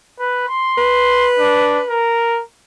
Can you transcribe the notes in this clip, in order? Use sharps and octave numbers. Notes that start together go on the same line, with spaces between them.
B4
C6
B4
D4
A#4